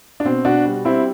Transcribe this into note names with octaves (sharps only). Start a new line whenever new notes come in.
D4
B2 C4
B2 D4 F#4
G3
G3 C4 E4